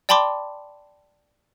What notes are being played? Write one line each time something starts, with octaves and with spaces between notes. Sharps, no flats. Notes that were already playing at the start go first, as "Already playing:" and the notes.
D5 G5 A5 B5 C6 D6